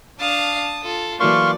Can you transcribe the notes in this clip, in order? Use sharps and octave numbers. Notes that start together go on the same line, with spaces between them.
D4 F5 A5 D#6
F4 A4
E3 F#3 A3 A#3 D5 F5 C6 C#6